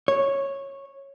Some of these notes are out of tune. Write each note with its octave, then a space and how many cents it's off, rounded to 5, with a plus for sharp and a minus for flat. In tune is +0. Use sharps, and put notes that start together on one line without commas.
C#5 -10